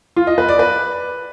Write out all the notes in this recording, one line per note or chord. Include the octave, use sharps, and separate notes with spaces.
F4
D#5
B4
D5
B4